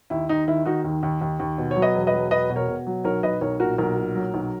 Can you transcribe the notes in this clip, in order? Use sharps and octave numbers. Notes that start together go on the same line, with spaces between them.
D#2 E4
D#2 D#4
D#3 E4
D#3 D#4 F#4
D#2
D#2
D#2
D#2
B2
C#5
F#3
B4 D#5
E1
B4 D#5
F#3
E1 B4 D#5
B2
A#4 C#5
B2
F#3
B1 A#4 C#5
B1 B4 D#5
B1 A#4 C#5
A#2 F#4 A#4
B1 F#4 A#4
A#2
F#3
B1